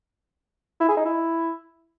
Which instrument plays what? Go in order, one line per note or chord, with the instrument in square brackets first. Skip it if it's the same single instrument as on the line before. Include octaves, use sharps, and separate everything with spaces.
[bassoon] E4
G#4
D#4
E4